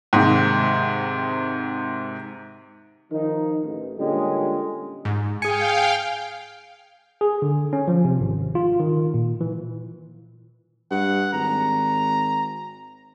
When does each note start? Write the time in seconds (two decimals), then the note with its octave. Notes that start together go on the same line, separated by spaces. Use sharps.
0.13 G#2 C3 D#3
3.12 D#3 F3 D#4
3.64 A1
3.99 A#2 D3 G3 G#3 C#4 G4
5.05 G#2
5.42 G#4 F5 G5 G#5 C#7
7.21 G#4
7.42 D3
7.73 C#4
7.88 F3
8.05 C3
8.20 G#1
8.55 F4
8.80 D#3
9.14 A#2
9.41 E3
10.91 G2 F#5
11.33 G#1 A#5